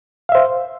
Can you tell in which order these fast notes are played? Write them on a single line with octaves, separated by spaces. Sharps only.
F5 E5 C5